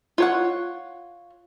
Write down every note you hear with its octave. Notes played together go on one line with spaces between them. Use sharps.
F4 C#5 F#5